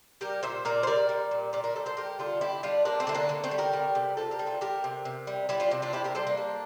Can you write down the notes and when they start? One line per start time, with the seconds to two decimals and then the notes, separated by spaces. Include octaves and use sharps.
0.21 G3 G4 A#4
0.43 A#2 C5 E5
0.65 A#2 A#4 D5
0.83 C5
0.87 G3 A#4 D5
1.09 G3
1.31 A#2
1.53 A#2 A#4 D5
1.64 A#4 D5
1.75 G3 A4 C5
1.86 A4 C5
1.97 G3 G4 A#4
2.19 D3 F4 A4
2.41 D3 E4 G4
2.63 G3 D4 F4
2.85 G3 A#3 D4
3.00 A3 C4
3.07 D3 E4
3.14 A#3 D4
3.29 D3 A#3
3.44 A3 C4
3.51 G3
3.58 G4 A#4
3.73 G3
3.95 C3
4.17 C3 F4 A4
4.31 G4 A#4
4.39 G3
4.46 F4 A4
4.61 G3 G4 A#4
4.84 C3
5.05 C3
5.27 G3
5.49 G3 E4 G4
5.60 D4 F4
5.71 C3
5.82 D4 F4
5.93 C3 E4 G4
6.04 G4 A#4
6.15 G3 A4 C5
6.27 A#3 D4
6.37 G3